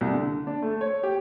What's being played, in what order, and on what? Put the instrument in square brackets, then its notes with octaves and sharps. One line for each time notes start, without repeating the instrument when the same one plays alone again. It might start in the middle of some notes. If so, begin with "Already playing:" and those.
[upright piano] C2
D3
D4
A3
C#5
G4